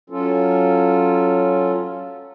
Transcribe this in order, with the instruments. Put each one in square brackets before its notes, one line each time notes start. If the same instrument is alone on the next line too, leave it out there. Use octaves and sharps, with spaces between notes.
[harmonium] F#3 C#4 F4 A4